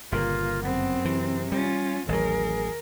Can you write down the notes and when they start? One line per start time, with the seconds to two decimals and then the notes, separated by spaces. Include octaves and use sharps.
0.12 G1 A#2 C#3 A#3 F4
0.62 F#2 B3 C4
1.05 C3 E3
1.52 G3 C#4 F4
2.08 A1 D#2 F#3 G#4 A#4